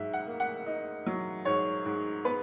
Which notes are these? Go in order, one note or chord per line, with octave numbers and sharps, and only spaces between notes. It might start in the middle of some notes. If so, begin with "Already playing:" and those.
Already playing: G#2 F#3 E5
F#5
A#3
F#5
D#4
F#3
G#2 C#5
G#2
B3 B4